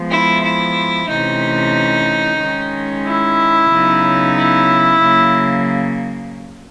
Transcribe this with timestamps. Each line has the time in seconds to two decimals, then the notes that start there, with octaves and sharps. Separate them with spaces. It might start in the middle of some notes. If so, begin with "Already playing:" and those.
Already playing: F3 G#3 B3
0.10 E4
0.43 E4
1.08 C3 E3 A3 C#4 D#4
2.39 D#3 G#3 C#4
3.05 E4
3.70 C#3 F#3 B3 D#4
4.36 E4
5.01 C#3 F#3 A#3